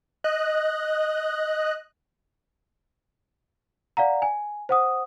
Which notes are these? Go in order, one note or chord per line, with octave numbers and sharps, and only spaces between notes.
D#5 F#6
D5 F5 F#5 A#5
G#5
C5 F#5 D#6